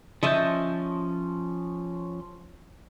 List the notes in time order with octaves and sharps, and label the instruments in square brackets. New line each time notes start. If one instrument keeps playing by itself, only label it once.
[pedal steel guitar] F3 C#4 G6 [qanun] D#5 E5 A5